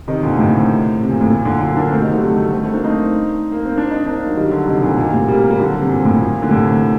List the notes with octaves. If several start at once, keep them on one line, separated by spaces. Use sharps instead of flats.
C3 D#3
A#2 D3
A2 C3
C3
A#2
A2
A#2
A#2 D3
D3 F#3
A#3 D4
A3 C4
C3 D#3
D3 F#3
G3
F#3 A3
F#3 A3
A3 C4
A3 C4
A#3 D4
C4 D#4
A#3
C4
D4
C4 D#4
A#3 D4
F#3
D#3 G3
D3 F#3
C3 D#3
A#2 D3
A#2
A2 C3
G3 A#3
G3
D3 F#3
C3
A#2
A2
A#2
D3
A2 C3